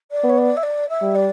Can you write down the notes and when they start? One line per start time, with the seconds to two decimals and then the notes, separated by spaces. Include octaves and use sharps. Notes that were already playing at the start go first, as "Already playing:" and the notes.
0.11 D5
0.24 B3
0.29 C#5
0.37 D5
0.56 E5
0.63 D5
0.88 E5
1.02 G3
1.15 D5